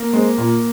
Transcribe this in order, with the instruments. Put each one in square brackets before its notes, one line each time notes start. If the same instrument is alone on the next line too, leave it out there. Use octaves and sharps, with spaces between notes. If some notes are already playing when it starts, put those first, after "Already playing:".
Already playing: [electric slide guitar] A#3
[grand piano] G#3 C4
A#2